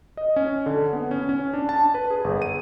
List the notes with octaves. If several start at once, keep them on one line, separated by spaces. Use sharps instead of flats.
D#5
C#4
D3
B3
C#4
C#4
D4
A5
B4
G#4
G1
D#7